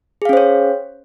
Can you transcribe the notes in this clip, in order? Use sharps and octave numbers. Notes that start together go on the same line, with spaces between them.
C#4 G#4 C5 C#5 F5